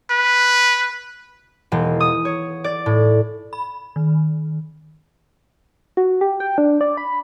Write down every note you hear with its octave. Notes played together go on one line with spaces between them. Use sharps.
B4
E1
D#6
C#5
D5
A2
B5
D#3
F#4
G4
G5
D4
D5
B5